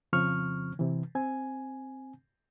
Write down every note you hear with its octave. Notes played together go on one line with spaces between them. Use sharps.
F2 C#3 F3 C4 C#6 F6
C3 E3
C4 G#5